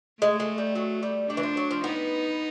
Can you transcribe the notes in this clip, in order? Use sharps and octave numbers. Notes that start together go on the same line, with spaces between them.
G#3 A3
G#3
G3
F#3
G3
G3 D4
E3
F3
F#3
F3
B3 D#4